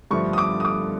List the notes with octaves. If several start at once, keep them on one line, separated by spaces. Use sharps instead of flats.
G2 D3 F3 A3 C#6
D#6
D6
D#6
D6